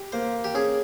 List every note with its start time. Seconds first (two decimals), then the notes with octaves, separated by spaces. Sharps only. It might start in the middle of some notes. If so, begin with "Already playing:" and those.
Already playing: G4
0.12 A#3 C5
0.44 G4
0.54 C#4 G#4